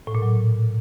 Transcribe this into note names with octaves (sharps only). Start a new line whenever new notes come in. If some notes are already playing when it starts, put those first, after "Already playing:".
A2
A#2
F#3